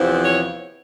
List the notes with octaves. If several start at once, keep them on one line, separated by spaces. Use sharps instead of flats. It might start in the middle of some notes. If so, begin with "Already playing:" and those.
Already playing: E2 C3 F3 C4 E4
C#5